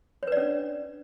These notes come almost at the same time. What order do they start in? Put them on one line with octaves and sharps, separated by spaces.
C#5 B4 D5 C#4 D4